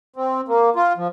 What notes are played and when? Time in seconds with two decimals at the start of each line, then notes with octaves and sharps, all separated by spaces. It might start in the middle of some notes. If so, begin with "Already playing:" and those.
0.16 C4
0.48 A#3
0.76 F4
0.97 F3